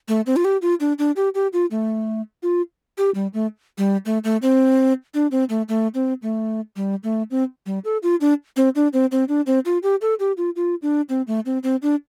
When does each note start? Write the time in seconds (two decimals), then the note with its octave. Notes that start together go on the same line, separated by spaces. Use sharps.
0.08 A3
0.27 C4
0.36 F4
0.45 G4
0.62 F4
0.80 D4
0.99 D4
1.16 G4
1.35 G4
1.53 F4
1.71 A3
2.43 F4
2.98 G4
3.15 G3
3.34 A3
3.78 G3
4.06 A3
4.24 A3
4.42 C4
5.14 D4
5.31 C4
5.50 A3
5.69 A3
5.94 C4
6.23 A3
6.76 G3
7.04 A3
7.31 C4
7.66 G3
7.85 A4
8.03 F4
8.21 D4
8.56 C4
8.75 D4
8.93 C4
9.12 C4
9.29 D4
9.47 C4
9.66 F4
9.83 G4
10.02 A4
10.20 G4
10.37 F4
10.56 F4
10.82 D4
11.09 C4
11.27 A3
11.46 C4
11.63 C4
11.82 D4